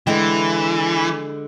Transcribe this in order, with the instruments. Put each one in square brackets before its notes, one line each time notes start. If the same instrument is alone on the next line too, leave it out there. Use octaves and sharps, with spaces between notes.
[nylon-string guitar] D3 G#3 G5 [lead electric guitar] E3